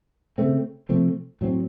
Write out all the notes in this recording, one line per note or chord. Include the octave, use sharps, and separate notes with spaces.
C#3 A3 C4
C3 F3 A3 C4
A2 F#3 C4